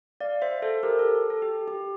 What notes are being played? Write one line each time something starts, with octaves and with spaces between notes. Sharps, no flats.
D5 F5
C5 E5
A4 C5
G4 A#4
A4
A4
G4
G4